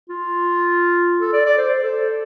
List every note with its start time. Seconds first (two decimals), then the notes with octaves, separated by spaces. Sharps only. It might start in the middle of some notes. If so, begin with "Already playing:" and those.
0.09 F4
1.20 A4
1.33 D5
1.46 D5
1.58 C5
1.83 A4